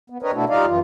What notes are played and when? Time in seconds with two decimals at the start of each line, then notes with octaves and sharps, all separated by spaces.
0.10 B3
0.23 C4 D4 A#4 B4 C#5 D#5
0.34 B2 A3 D4 E4 F#4 A4
0.49 G3 D#4 F4 D5 D#5 F5
0.67 F#2 E3 F4